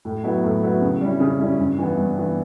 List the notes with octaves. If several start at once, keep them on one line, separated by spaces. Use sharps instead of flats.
A2
F#3 B3 E4
A2
F#3 B3 E4
C#3
G3 C#4 E4
C#3
G3 C#4 E4
G2
E3 B3
G2
E3 B3